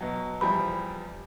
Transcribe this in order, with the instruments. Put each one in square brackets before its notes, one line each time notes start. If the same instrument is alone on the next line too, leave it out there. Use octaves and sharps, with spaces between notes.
[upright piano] B2 F#3
[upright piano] E2 F3 G3 [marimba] B5